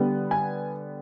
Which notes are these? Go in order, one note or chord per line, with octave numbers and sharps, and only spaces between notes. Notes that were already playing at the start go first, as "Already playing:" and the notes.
Already playing: D3 G3 B3
G#5